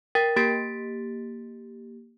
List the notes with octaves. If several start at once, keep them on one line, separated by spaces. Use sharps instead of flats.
A#4 G5 A6
A#3 G4 A6 B6 D7